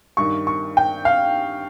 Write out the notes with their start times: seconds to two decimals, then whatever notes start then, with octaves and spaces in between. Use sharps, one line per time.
0.17 G2 D#3 C#6
0.47 C#6
0.77 G5
1.05 F5